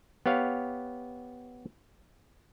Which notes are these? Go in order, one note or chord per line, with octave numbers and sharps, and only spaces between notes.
B3 G4 C#5 F5